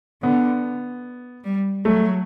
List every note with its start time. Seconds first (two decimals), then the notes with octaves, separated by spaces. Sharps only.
0.23 D3 B3
1.44 G3
1.85 F#3 A3